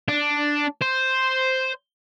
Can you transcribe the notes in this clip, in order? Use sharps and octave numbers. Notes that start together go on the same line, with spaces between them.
D4
C5